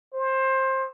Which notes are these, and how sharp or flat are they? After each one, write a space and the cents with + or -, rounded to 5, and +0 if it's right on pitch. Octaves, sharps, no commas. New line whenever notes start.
C5 +20